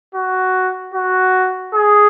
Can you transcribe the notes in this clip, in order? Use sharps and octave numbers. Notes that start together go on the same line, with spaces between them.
F#4
F#4
G#4